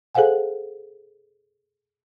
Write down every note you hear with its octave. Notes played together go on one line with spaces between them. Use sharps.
G#4 A4 C5 F5 F#5 G#5